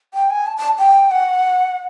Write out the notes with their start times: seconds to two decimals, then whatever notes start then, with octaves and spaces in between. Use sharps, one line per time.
0.14 G5
0.30 G#5
0.46 A5
0.57 A5
0.79 G5
1.11 F#5